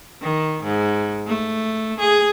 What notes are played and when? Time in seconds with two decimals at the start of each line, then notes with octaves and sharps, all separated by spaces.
0.21 D#3
0.63 G#2
1.27 A3
2.00 G#4